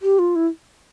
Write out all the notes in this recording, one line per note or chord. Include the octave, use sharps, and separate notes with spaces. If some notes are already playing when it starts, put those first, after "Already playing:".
G4
F4
E4